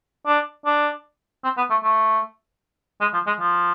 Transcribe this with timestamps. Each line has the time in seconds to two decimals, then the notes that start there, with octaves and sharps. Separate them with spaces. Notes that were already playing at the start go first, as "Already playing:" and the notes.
0.27 D4
0.66 D4
1.44 C4
1.58 B3
1.70 A3
1.83 A3
3.01 G#3
3.14 F3
3.27 G#3
3.40 F3